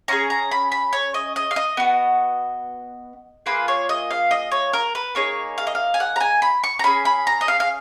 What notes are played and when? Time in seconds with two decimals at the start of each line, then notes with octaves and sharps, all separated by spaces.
0.08 C#4 F4 G#4 A#5
0.30 A#5
0.51 B5
0.72 B5
0.93 C#5
1.14 D#5
1.36 D#5
1.51 F5
1.56 D#5
1.77 B3 F#4
3.46 A#3 F4 G#4 B4
3.68 C#5
3.89 D#5
4.10 F5
4.31 D#5
4.52 C#5
4.73 A#4
4.95 B4
5.15 A#3 D#4 G#4 C#5
5.58 F5
5.67 D#5
5.75 F5
5.94 G#5
6.00 F#5
6.16 A#5
6.20 G#5
6.42 B5
6.64 C#6
6.79 A#5
6.84 C#4 G#4 B5
7.05 B5
7.27 A#5
7.41 D#5
7.48 F5
7.60 F5